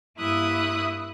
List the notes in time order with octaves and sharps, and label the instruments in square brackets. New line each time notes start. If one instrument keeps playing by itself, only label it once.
[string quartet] G2 A#3 E4 E5 D#6 F#6